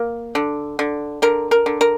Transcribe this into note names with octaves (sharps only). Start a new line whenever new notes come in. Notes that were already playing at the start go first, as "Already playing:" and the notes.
Already playing: A#3
D3
D3
D3 A#4
A#4
D3
A#4